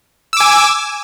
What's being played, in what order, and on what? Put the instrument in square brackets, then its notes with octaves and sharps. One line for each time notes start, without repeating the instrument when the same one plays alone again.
[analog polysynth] E6
D6
G#5